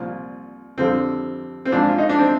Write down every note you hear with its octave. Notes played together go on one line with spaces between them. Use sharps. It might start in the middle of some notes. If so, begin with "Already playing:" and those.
Already playing: C2 A#2 F3
F2 D3 G3 C4
C4
A#1 G#2 F3 D4
F4
D#4
D4
C4